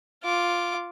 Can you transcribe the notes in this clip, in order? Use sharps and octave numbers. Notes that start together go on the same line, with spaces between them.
F4 D6